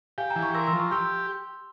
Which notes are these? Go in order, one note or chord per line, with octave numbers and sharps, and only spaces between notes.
G4 F5 G#5
G5 A#5
E3
A#5 C#6
A#4 C6 E6
C6 E6
F3
A#5 C#6
G4 C6 E6